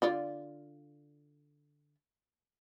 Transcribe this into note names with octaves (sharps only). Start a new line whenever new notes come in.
D3 F4 D5